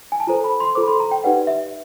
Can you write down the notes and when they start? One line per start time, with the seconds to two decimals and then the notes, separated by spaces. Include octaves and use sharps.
0.12 G#5
0.20 A5
0.27 F4 A4 C5 A#5
0.44 B5
0.60 C6
0.75 F4 A4 C5 D6
0.82 B5
0.88 C6
1.00 A#5
1.11 G5
1.24 D#4 G4 B4 D5 F#5
1.47 E5